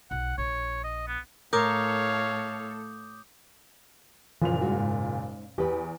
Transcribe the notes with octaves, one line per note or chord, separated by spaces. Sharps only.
B1 F#5
A#1 C#5
D#5
B3
A2 A4 A#4 C#5 F5 D6 D#6 G6
F#1 A#2 E3 F3 F4 F7
G2 G#3 F#4
G#2
E2 G4 B4